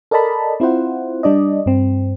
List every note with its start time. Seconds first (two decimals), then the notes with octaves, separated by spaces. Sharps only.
0.11 A4 A#4 D5 D#5 A5 B5
0.60 C4 E4 F4 C5 F#5
1.23 G3 D4 D5 D#5
1.66 G2 C4